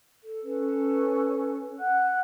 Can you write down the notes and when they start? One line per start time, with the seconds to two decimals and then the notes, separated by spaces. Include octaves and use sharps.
0.22 A4
0.44 C#4 A4 B4
1.78 F#5 F#6